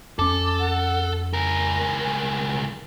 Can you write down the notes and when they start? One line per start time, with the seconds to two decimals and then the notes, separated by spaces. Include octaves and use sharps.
0.19 F2 C#4 A4 D6
0.59 F#5
1.33 C#2 A#4 G#5